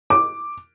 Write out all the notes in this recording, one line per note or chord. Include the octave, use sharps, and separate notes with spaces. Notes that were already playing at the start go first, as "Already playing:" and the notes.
D6